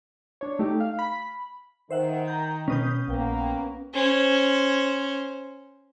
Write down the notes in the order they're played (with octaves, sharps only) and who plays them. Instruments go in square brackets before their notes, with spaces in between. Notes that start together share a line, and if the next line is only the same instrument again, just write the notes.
[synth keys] D4 C#5
A3 D#4 G4
F5
B5
[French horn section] D#3 [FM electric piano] C5 E5 F#5
[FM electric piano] A#5 G6
[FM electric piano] B2 D#6 G6 [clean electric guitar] C#4 B4
[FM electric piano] A#1 G5 [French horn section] A#3 B3
[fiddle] C#4 C5